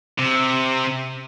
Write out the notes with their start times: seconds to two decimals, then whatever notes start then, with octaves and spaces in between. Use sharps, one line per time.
0.19 C3